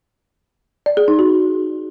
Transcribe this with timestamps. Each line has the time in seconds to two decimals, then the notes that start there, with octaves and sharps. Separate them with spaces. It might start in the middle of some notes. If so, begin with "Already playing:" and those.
0.86 D5
0.97 G#4
1.08 D#4
1.19 F#4